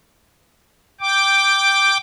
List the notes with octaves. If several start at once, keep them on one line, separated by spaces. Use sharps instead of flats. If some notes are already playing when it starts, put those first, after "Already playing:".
G5 D6